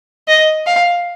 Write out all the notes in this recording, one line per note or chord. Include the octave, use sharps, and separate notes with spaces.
D#5
F5